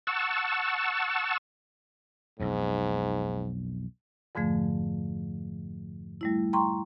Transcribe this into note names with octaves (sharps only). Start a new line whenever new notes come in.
F#5 A5 C#6 E6
B1 F2 G#2
F2 G#2 D3 F3 A3
G3 A3 E4
G5 A#5 C6 C#6